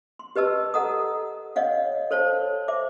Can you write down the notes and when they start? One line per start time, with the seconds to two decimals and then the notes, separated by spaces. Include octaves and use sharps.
0.19 C6
0.36 G4 B4 D#5 A5 E6
0.74 A4 D#5 F#5 A#5 D#6
1.56 C#5 D#5 F5 F#5
2.11 A4 C5 C#5 F5 A5
2.68 C5 E5 D6